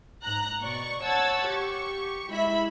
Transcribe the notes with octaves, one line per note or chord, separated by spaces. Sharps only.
G#2 A#5 F#6
B2 D5 C#6
C#5 F#5 A5 E6 G#6 A6
G4 C#6
G#3 E4 E5 B5 B6